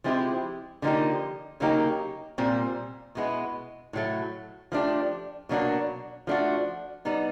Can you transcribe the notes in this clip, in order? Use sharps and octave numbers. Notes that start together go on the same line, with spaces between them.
F3 G#3 C4 E4 G4
D3 F3 A#3 D#4 G4
C#3 F#3 A#3 D#4 G4
A#2 G3 C4
B2 G#3 B3 E4
A2 F#3 A3
F3 A3 D4 G4
B2 F#3 A#3 D4 F#4
F3 A3 D4 F#4
G3 B3 D#4